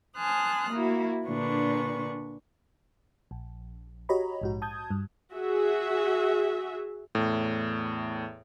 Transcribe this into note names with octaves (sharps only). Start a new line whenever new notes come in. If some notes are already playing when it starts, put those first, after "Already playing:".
G#5 A5 C6 D#6 F6 F#6
A#3 E4 F#4
A#2 D3 D4 B4 C#6
A#1
F#4 G4 C#5 D#5 A#5 B5
A#1 G#2 F#4
A5 D#6 G6 G#6
G2
F#4 G#4 E5
E2 A2